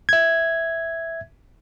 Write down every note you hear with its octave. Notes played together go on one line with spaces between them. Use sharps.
E5 G#6